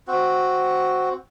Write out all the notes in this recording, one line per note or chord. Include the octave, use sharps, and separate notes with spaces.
C4 F#4